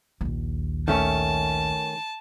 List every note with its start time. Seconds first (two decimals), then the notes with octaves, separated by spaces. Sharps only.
0.21 A#1 D#2
0.88 D#3 A3 C#4 A5